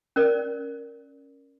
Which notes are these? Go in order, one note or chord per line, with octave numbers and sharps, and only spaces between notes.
C#4 A#4 D5